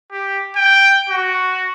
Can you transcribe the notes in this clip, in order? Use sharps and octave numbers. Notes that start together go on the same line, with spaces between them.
G4
G5
F#4